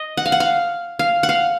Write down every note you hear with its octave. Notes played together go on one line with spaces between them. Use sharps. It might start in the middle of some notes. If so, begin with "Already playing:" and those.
Already playing: D#5
F#5
F5
F#5
F5
F5
F#5
F5